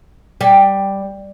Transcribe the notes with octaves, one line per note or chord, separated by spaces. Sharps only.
G3